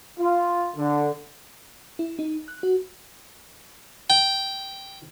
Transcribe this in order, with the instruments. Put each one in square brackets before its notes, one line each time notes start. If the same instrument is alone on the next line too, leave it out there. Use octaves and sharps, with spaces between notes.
[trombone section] F4
D3
[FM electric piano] E4
D#4
F#6
F#4
[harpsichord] G5